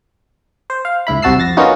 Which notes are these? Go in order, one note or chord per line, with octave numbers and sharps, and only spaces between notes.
C5
F5
C#2 G#2 E4 B5
C2 C3 F#4 A5 E6 C7
F2 A6 A#6
A#3 B3 C#4 D#4 F4 F#4